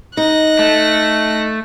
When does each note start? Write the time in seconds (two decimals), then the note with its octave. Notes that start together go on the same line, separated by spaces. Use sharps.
0.17 D#4 F#6 A#6
0.59 A3